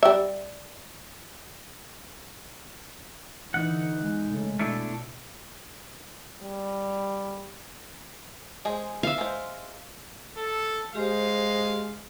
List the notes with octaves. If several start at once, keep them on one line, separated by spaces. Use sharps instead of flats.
G3 E5
D3 E3 D#4 F#5
E2 G#3
C#3 A3
B2 A3 D4 E4
G3
G#3 G#4 C5
E5 F5
G#3 C5
A4
G#3 G4 C5 F5